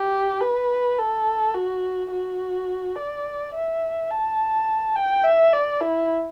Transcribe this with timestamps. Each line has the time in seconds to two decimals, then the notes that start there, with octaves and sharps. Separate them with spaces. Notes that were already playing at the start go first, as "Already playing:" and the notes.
Already playing: G4
0.41 B4
0.98 A4
1.54 F#4
2.11 F#4
2.96 D5
3.54 E5
4.11 A5
4.96 G5
5.24 E5
5.53 D5
5.81 E4